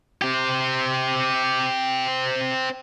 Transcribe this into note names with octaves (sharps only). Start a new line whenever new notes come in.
C4 G4